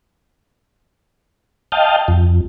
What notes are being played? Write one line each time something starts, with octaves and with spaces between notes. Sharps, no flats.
D#5 F5 G5 A5
F2